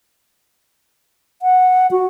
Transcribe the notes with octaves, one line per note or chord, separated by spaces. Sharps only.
F#5
F#4